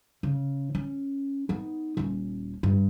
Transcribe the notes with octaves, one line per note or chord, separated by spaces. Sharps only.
C#3
C#4
B3 D#4
D#1 C#4
G2